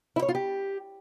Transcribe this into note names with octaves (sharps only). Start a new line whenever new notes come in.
E4
C#5
F4
G4